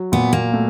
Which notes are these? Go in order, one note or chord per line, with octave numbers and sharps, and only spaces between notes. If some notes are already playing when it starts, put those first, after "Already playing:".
Already playing: F#3
A#2 B3
A#3
A3